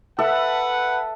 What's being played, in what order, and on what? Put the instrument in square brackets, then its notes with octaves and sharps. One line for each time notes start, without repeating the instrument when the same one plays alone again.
[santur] A4 E5 [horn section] B4 F#5